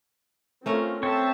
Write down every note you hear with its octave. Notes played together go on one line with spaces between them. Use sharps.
A3 C4 C#4 F4 A#4
C4 A4 C#5 E5 A5